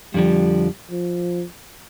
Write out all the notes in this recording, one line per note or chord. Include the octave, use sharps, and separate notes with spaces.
F2 D3 F3 G3
F3